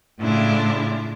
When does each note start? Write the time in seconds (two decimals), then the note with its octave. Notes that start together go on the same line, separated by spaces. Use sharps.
0.19 A2 C#3 D4 E4 F4